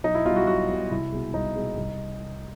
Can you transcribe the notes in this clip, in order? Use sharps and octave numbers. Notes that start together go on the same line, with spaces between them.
B1 D#4
E4
B2 G3 F4
F#4
B1 F#4
B2 G3
C2 E4
B2 G#3
C2 D#4
B2 G#3
C2